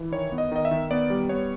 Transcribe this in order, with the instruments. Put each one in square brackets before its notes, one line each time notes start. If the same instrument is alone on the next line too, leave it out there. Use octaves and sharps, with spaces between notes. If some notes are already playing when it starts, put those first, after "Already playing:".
Already playing: [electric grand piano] E3
D#3 C#5
B3
D#5
D#3 D#5
E5
D#3
B3 D5
G3
B3 C#5